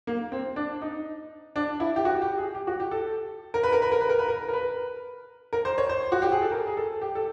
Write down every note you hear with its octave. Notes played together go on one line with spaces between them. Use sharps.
A#3
C4
D4
D#4
D4
E4
G4
F#4
G4
G#4
G4
F#4
G4
A4
A#4
B4
A#4
B4
A#4
B4
A#4
B4
A#4
A#4
B4
A#4
C5
C#5
C5
F#4
G4
G#4
A4
A#4
G#4
A4
G4
A4